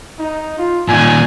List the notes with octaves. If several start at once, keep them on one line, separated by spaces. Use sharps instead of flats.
D#4
F4
A#2 D#3 G#5